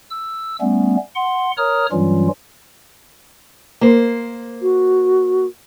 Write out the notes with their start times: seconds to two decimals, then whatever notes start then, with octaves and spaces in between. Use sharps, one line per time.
0.10 E6
0.61 G3 A3 B3 C#4
1.15 F#5 C6
1.57 A#4 C#5 A#5 D#6 F6
1.92 G2 E3 F#3 G3 C#4 F4
3.81 A#3 C5
4.62 F#4